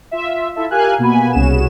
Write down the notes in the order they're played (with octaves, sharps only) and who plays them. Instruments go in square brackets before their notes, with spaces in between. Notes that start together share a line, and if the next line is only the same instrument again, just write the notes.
[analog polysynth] F4 E5
E4 F4 A4 E5
G4 A#4 F5 G#5 F#6
B2 A#3 B3 F#4 G#5 B5
C2 C#4 F#4 G#4 E7